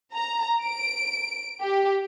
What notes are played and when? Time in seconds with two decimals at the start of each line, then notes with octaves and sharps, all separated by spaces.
0.13 A#5
0.64 D7
1.62 G4